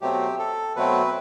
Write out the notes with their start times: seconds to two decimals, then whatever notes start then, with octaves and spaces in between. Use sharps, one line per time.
0.01 B2 F#3 A3 C4 G4
0.39 A4
0.76 B2 F#3 A3 C4 B4